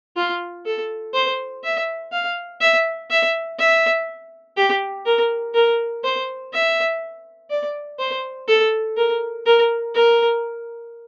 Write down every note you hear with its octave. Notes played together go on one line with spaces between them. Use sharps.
F4
A4
C5
E5
F5
E5
E5
E5
G4
A#4
A#4
C5
E5
D5
C5
A4
A#4
A#4
A#4